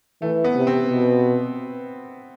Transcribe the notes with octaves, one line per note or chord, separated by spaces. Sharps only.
E3 A3
B3
C3
C4
B2